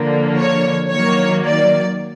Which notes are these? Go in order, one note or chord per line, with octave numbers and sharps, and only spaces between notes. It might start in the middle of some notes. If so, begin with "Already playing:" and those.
Already playing: D3 F3 A#3
C#5
D#3 F#3 A#3 C#5
D5